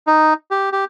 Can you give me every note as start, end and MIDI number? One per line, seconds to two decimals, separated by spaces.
0.07 0.34 63
0.51 0.69 67
0.72 0.85 67